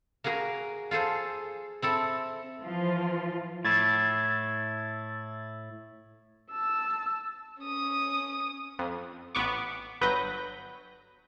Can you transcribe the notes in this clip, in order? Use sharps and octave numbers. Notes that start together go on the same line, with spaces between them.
A#3 F#4 G#4 A#4
F4 G#4 A4 C5
C4 E4 A4
E3 F3 F4
A2 E4 G#6 A6
A5 E6
C#4 D#6
F2
A1 B3 C#6 D6
G1 F#3 B4 G6 A#6